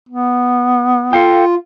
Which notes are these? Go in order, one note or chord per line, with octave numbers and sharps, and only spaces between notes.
B3
F4 A4 F5 G5